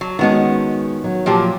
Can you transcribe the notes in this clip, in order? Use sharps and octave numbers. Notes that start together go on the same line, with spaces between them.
F#3
D#3 G#3 B3 C#4 F#4
F#3
A#2 F3 G4